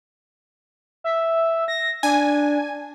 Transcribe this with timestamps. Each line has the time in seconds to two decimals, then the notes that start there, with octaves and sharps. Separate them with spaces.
1.04 E5
1.68 A#6
2.03 D4 G#5